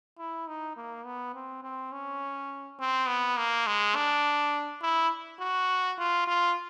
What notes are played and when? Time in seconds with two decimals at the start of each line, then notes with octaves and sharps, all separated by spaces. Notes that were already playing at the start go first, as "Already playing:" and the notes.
0.19 E4
0.48 D#4
0.77 A#3
1.05 B3
1.34 C4
1.63 C4
1.92 C#4
2.79 C4
3.08 B3
3.37 A#3
3.66 G#3
3.95 D4
4.82 E4
5.40 F#4
5.98 F4
6.27 F4